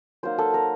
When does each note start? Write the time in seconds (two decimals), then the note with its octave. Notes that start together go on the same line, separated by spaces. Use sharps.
0.23 F#3 A#3 D#4 C5
0.38 A4
0.54 A#4